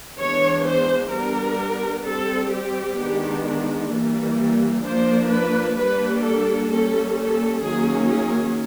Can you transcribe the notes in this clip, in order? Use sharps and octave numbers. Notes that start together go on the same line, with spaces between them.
E3 G#3 B3 D4 C#5
C5
G3 B3 D4 A#4
G3 C4 A4
G4
D#3 G#3 B3 D4
E3 G3 A#3
F3 A#3 D4 C5
B4
G3 A#3 D4 B4
A4
G3 A#3 C#4 A4
A4
D#3 F#3 A#3 C#4 G#4
G#4